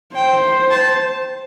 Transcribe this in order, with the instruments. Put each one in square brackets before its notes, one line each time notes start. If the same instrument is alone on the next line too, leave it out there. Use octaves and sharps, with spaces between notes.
[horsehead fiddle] C5 [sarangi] G5
[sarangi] A5